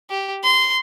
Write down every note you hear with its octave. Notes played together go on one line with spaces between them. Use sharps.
G4
C6